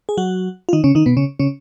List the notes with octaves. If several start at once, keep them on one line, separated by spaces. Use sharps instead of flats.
G#4
F#3 F#4
F4
D#3 D#4
C#3 C#4
D#3 D#4
B2 B3
C#3 C#4
C#3 C#4